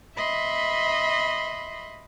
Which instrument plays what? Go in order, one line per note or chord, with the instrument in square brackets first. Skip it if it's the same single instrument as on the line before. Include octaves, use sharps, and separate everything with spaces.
[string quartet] D#5 E5 B5 C6